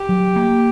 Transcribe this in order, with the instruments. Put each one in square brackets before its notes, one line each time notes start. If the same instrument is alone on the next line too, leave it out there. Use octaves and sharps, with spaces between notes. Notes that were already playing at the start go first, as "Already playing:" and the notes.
Already playing: [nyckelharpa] G4
[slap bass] F#3
A#3